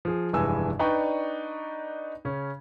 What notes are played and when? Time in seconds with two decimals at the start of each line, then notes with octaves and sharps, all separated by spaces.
0.05 F3 G#4
0.33 F1 G2 E3 G#3 G#5 E6
0.79 D4 D#4 B4 D5 G5 C#6
2.25 C#3 C#4